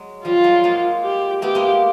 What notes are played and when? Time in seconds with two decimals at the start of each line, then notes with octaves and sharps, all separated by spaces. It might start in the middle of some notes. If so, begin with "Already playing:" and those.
Already playing: F#3 G#3
0.25 F3 G3 F4
0.44 F#3 G#3
0.64 G#3 A#3
1.04 G4
1.42 A3 B3 G4
1.55 G#3 A#3